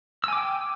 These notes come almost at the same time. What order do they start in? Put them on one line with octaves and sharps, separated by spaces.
E6 G#5 D6 G5